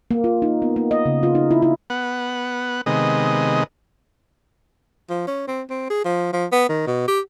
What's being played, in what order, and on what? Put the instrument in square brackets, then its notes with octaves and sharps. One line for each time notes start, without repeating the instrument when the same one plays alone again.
[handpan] A#3
F4
D#4
B3
A#3
D#5
C#3
F4
D#4
E4
E4
[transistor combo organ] B3 F#5
C3 D#3 G#3 B3 D#5
[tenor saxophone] F3
C#4
C4
C4
G#4
F3
F3
B3
D#3
B2
G4